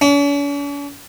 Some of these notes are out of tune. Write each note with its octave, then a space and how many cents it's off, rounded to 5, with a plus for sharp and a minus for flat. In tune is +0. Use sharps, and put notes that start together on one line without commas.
C#4 +45